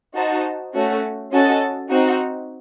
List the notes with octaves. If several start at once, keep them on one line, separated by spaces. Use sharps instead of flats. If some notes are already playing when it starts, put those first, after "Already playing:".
D#4 F#4 C5 D#5 A5
A3 C#4 F#4
C#4 F#4 A4 D#5 A5
C4 D#4 F#4